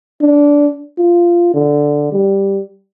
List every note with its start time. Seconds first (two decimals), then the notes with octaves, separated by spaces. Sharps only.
0.21 D4
0.98 F4
1.54 D3
2.12 G3